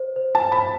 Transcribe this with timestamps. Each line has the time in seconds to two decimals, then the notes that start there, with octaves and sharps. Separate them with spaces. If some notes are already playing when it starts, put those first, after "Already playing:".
Already playing: C5
0.16 C5
0.35 A5
0.52 C5 B5